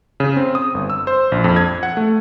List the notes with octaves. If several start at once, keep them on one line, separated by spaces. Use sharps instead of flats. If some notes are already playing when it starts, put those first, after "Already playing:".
C#3
C4
D#6
G1
E6
C5
A#1
F2
G#6
F#5
A3